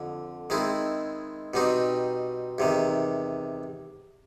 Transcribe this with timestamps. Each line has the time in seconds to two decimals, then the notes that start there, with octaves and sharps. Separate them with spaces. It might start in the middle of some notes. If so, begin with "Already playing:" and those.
Already playing: F2 D3
0.50 D#3 G#3 C4 E4
1.54 B2 G3 C4 D#4
2.58 E2 C3 D#3